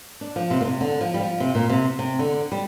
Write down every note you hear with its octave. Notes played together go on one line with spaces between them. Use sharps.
D4
F3
C3
A#2
C3
D3
F3
G3
F3
C3
A#2
C3
C3
D3
G3